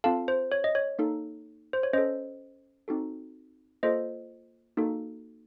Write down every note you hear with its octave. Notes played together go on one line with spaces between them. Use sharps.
C4 F4 A4 F5 A5
C5
C#5
D#5
C#5
A#3 D#4 A4
C5
C#5
C#4 A4 C5 D#5
C4 D#4 F#4 A4
A#3 F4 A4 C5 D#5
A#3 D#4 F#4 A4